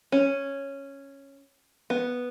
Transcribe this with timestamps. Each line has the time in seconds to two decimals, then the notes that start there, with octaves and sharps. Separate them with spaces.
0.12 C#4
1.90 B3